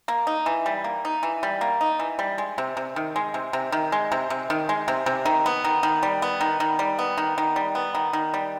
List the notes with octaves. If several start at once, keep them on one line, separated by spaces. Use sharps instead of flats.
A#3
D#4
E3
G3
A#3
D#4
E3
G3
A#3
D#4
E3
G3
G#3
C3
C3
D#3
G#3
C3
C3
D#3
G#3
C3
C3
D#3
G#3
C3
C3
D#3
B3
D#3
D#3
G3
B3
D#3
D#3
G3
B3
D#3
D#3
G3
B3
D#3
D#3
G3